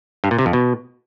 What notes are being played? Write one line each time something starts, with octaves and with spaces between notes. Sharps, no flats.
G2
A#2
C3
F2
B2